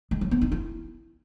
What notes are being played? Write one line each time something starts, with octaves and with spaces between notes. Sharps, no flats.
G#3
F#3
B3
D#4
E4